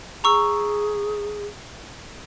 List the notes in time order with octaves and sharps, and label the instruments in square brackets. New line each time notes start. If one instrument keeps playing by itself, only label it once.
[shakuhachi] G#4 [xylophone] A#5 C#6 E6